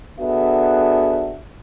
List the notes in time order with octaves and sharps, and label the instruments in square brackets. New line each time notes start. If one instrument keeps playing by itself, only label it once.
[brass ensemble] B3 D4 F#4 G#4 A4 E5